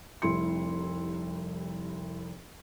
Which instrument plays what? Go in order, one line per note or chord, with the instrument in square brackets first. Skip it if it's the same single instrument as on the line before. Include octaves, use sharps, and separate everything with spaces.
[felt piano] F1 C2 E4 C6 C#7